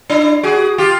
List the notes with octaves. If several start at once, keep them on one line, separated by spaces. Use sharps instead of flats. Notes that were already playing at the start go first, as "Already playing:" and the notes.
D4 E4
F#4 G#4
F4 G4